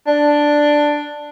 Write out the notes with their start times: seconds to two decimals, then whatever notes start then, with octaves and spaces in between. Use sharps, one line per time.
0.07 D4